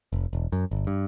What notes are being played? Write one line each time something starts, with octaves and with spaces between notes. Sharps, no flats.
F1
E1
F#2
G1
G2